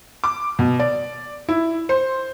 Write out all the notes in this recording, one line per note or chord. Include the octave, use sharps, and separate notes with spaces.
D6
B2
D5
E4
C5